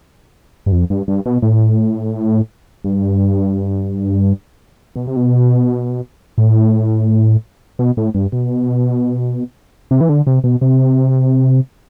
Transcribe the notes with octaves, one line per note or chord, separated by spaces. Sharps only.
G2
F2
G2
G2
B2
A2
G2
B2
C3
B2
A2
B2
A2
G2
B2
C3
E3
D3
C3
B2
C3